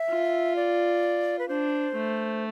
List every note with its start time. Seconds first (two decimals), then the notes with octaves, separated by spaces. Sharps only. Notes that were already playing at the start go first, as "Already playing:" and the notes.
Already playing: E5
0.10 F4
0.56 D5
1.39 B4
1.48 D4 C5
1.95 A3